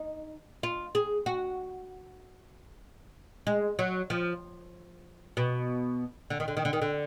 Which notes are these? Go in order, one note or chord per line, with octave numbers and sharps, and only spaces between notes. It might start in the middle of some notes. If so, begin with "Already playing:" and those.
Already playing: D#4
F4
G#4
F#4
G#3
F#3
F3
B2
D3
D#3
D3
D#3
D3
D#3
D3